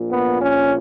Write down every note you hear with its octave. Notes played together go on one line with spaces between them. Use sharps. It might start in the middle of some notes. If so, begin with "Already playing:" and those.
Already playing: A#1 A#2
B3
C#4